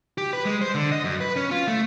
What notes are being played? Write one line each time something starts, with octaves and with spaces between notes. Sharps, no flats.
G4
B4
G#3
C5
D3
D#5
F#2
B4
C#4
F4
A3